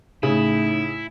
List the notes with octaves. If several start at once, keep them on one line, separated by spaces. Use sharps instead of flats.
A2 C#3 D#4 E4